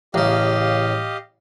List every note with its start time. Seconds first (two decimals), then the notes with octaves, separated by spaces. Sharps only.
0.14 A1 C#3 G4 D#5 F5